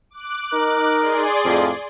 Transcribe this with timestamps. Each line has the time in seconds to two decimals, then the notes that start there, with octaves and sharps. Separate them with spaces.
0.10 D6 F#6
0.54 D#4 A#4
0.99 G#4 D5 C6
1.45 F2 A2 F3